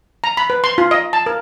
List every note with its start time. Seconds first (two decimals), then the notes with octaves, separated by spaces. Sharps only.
0.24 A#5
0.37 B5
0.50 B4
0.64 C6
0.78 F4
0.91 D#5
1.13 A5
1.26 A#4